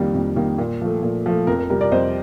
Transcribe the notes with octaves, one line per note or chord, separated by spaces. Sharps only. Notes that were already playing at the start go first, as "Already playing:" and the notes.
Already playing: F2 D#3 G3 A#3
F2
D#3 G3 A#3
A#2
F3 A3
A#2
F3 A3
F2 A#4
A#4
C3 G3 A#4
A#4 D5
F2 C5 D#5